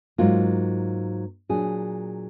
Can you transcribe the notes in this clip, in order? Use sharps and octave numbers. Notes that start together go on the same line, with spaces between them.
G#2 F#3 A#3 F4
A#2 F#3 D4 G#4